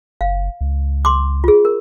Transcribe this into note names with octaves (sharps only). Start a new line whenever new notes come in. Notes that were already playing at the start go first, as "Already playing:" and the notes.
F#1 F5
C#2
C6 D6
F4 G#4
A#4